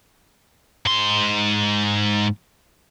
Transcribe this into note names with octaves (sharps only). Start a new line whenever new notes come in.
G#2 C6